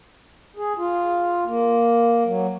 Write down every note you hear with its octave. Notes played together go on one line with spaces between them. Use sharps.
G#4
F4
A#3
F#3